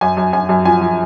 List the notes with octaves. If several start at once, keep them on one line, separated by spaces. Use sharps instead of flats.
F#2 G#5
F#2
F#2 G#5
F#2
F3 G#5
F3